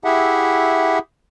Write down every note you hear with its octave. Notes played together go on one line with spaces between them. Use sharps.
E4 G4 G#4 E5 F#5